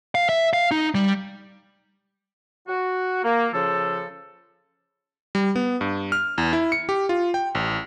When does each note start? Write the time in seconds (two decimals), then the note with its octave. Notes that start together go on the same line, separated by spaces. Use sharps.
0.15 F5
0.29 E5
0.53 F5
0.71 D#4
0.95 G3
2.68 F#4
3.24 A#3
3.53 C#3 F3 A4
5.35 G3
5.56 B3
5.81 G2
6.12 F6
6.38 E2
6.53 E4
6.72 C#7
6.89 G4
7.09 F4
7.34 G5
7.55 A1